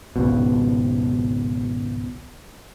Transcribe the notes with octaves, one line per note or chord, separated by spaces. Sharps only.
G#1 C#2 B2